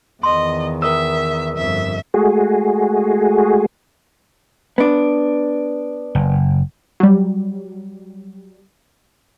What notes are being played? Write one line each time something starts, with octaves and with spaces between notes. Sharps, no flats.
E2 D#3 D#5 C6
A#4 B4 E5 G5 D#6 E6
G1 F2 E5
G#3 A3 F#4 G#4
B3 D4
F#1
F#3 G3